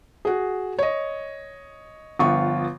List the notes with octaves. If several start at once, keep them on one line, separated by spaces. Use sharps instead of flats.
F#4 G#4
C#5 D#5
G1 F3 B3 F4 C#6